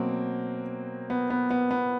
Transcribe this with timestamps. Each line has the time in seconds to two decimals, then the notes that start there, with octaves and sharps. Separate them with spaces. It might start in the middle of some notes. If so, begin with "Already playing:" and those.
Already playing: B2 F#3 A#3 C4
1.10 B3
1.30 B3
1.50 B3
1.71 B3